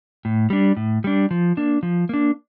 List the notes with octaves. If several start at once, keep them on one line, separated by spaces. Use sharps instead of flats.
A2
G3 D4
A2
G3 D4
F3
A#3 D4
F3
A#3 D4